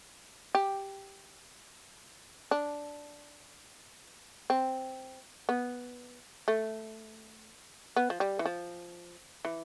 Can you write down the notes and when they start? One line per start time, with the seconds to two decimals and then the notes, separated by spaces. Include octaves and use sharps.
0.55 G4
2.51 D4
4.50 C4
5.49 B3
6.48 A3
7.96 B3
8.10 F3
8.20 G3
8.39 E3
8.46 F3
9.45 E3